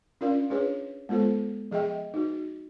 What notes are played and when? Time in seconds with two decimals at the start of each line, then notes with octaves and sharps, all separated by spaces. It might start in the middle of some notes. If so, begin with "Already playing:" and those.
0.21 C#4 D4 F4 A#4 D5 F5
0.50 D4 F4 G#4 B4 C#5
1.09 G#3 B3 F4 A4 C5
1.71 F3 G#4 D#5 E5 G5
2.14 D#4 F#4